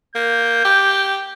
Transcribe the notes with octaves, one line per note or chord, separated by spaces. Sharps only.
A#3 G6
G4